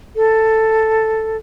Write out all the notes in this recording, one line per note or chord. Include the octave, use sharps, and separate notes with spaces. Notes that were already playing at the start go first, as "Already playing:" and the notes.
A4